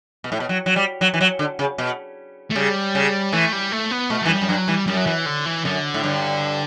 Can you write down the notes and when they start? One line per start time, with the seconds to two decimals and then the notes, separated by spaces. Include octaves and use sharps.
0.24 B2
0.32 A2
0.40 B2
0.49 F#3
0.66 F#3
0.76 G3
1.01 F#3
1.14 E3
1.21 F#3
1.39 D3
1.59 C#3
1.78 B2
2.50 A3
2.55 C#3 G3
2.95 C#3
3.33 E3 A3
3.52 G3
3.72 A3
3.91 B3
4.10 B2 A3
4.22 F#3
4.25 E3
4.29 F#2 G3
4.42 F#2
4.49 G2 F#3
4.68 E3 G3
4.87 F#2 G3
4.97 F#3
5.07 E3
5.26 D3
5.46 E3
5.65 F#2 D3
5.94 A2
6.04 G2